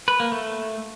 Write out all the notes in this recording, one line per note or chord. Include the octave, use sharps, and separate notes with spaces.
B4
A#3
A3